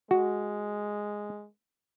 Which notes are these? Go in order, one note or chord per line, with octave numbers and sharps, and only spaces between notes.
G#3 F#4